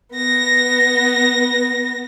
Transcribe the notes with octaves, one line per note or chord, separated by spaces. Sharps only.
B3 A#6